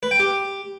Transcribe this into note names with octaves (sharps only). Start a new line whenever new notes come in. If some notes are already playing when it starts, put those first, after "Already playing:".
B4
G5
G4